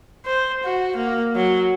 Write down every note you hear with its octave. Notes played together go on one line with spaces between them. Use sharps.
C5
F#4
A#3
F#3